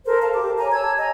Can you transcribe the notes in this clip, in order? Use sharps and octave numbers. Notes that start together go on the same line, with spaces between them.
A4 A#4 C5
F5 A5
G4 D6
C#5 G#5 A#5
A5 E6 G#6
D#5 G#5 A#5